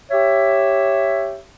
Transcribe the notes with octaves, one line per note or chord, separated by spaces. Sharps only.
G4 C#5 E5